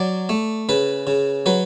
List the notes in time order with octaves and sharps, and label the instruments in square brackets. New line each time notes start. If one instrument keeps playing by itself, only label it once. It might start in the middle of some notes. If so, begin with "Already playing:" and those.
Already playing: [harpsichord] F#3 D5
A3
C#3 B4
C#3
F#3 B4